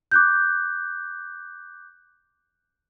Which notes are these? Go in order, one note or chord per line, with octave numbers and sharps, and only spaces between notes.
D6 F#6 G6